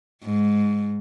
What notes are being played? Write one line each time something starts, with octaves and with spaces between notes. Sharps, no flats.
G#2